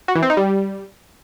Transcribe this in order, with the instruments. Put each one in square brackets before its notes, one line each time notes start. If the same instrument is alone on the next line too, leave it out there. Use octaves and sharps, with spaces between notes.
[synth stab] F#4
E3
C4
D#4
G3